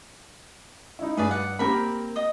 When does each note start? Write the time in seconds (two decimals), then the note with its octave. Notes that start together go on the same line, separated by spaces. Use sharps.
0.99 D#4 E4
1.17 G2 G#4 B4 D5
1.31 F#5
1.59 A#3 C4 G4 A#4 B5
2.16 D#5 D#6